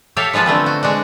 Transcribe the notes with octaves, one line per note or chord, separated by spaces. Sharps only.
G4 A4 C#5 E5 F5
F3 G#3 F4 B4 A5
D3 A3 B3 C4
F#4
G#3 D4 F#4